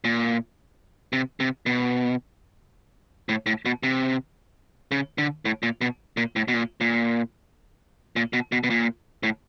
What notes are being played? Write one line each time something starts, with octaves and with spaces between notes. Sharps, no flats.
A#2
C3
C3
B2
A2
A2
B2
C3
C#3
D3
A2
A#2
B2
A#2
A2
B2
A#2
A#2
A#2
B2
B2
B2
A#2
A2